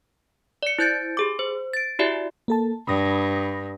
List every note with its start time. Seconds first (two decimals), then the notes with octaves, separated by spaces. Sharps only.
0.63 D5 C#7
0.79 E4 C5 G6 A6 C#7 D7
1.17 G4 G#4 D6
1.39 C5
1.73 A6 D7
1.99 E4 F#4 G4 D5 E5
2.48 A#3 A4 A5
2.87 G2 B5 D#6 A#6